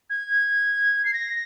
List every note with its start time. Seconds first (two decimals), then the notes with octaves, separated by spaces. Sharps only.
0.09 G#6
1.05 C7
1.13 A#6